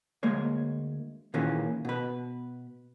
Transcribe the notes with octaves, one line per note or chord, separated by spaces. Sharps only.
D2 G#3 A#3 C#5
A#2 D#3 E3 A#3 C#4 G#4
B2 B4